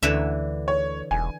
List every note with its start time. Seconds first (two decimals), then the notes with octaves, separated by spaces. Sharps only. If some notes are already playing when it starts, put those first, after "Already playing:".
0.03 D2 D3 E3 E5
0.68 C#5
1.11 E1 G#5